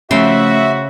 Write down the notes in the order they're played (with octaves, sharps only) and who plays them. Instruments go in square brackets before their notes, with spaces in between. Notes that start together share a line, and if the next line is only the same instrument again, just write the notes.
[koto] C#3 C5 [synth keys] F3 A3 C#4 [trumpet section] F#4 [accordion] E5